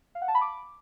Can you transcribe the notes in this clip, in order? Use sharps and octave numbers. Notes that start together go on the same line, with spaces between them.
F5
F#5
A5
B5
D6